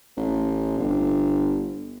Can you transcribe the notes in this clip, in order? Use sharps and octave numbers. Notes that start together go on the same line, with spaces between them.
A1
G1